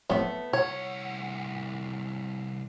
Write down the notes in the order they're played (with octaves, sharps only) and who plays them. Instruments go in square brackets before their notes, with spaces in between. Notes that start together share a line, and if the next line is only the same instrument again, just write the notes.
[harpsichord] F2 A2 [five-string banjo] A3 B3
[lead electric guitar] C2 F#5 [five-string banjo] C#5